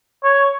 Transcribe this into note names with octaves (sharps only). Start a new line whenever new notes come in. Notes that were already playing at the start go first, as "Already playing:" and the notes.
C#5